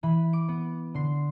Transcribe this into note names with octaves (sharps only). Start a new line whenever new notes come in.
E3 B5
D6
B3
D3 C6